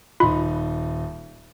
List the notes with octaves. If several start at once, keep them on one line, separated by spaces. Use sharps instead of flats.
D#1 D#4 F4 B5